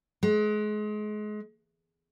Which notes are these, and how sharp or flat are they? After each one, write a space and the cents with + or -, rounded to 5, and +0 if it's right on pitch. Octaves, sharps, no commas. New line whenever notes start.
G#3 +30